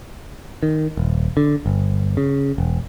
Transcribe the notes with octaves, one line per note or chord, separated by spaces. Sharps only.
D#3
D#1
D3
G1
C#3
E1